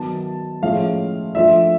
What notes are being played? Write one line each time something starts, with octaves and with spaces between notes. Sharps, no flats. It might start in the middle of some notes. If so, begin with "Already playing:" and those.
Already playing: D#3 F#3 B3 D#4 A5
A2 F3 G#3 C#4 E4 F5
F3 A3 D4 F4 E5